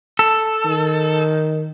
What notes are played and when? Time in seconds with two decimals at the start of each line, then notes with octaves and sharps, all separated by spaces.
0.19 A4
0.65 D#3